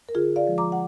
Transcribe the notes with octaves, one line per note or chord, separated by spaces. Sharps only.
A#4
D3 F4 G#4
D5 F5
F3 G#3
A#5 D6
F#5